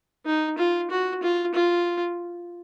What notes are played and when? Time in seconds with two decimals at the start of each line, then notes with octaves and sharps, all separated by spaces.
0.26 D#4
0.58 F4
0.90 F#4
1.22 F4
1.54 F4